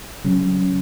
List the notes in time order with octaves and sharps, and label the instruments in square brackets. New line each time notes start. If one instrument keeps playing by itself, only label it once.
[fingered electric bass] C#3 F#3 C#4